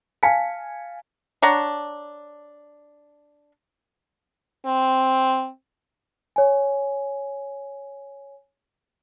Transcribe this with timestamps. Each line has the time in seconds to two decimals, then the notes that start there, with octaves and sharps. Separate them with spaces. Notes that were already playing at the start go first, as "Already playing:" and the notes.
0.23 F5 G#5 A5 B6 C#7
1.42 D4 C#5 F#5 A#5
4.66 C4
6.36 C#5 G#5